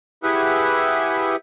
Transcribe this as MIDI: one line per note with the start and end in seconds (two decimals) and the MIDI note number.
0.23 1.36 64
0.23 1.36 67
0.23 1.36 68
0.23 1.36 71
0.23 1.36 76
0.23 1.36 78